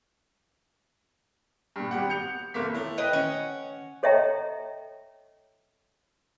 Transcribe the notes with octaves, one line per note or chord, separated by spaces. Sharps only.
G2 A#2
G#1 G3 G4 F#5
G6 C#7 F7
F1 A3 A#3 B6
A2
B4 D#5 G5
C#4 F#5
A4 C#5 D#5 E5 G5 A#5